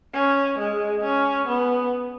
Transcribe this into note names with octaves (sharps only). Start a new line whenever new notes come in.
C#4
G#3
C#4
B3